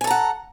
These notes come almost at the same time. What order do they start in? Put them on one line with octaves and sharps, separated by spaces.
G#5 A4 A#5 F#5